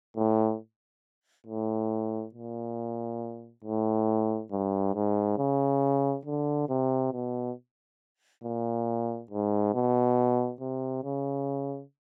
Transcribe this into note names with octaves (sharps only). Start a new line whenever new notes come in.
A2
A2
A#2
A2
G2
G#2
C#3
D3
C3
B2
A#2
G#2
B2
C3
C#3